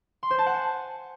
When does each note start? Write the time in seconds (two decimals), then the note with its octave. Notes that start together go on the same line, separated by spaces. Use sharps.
0.23 C6
0.31 C5
0.38 A5
0.46 F#5
0.54 G#5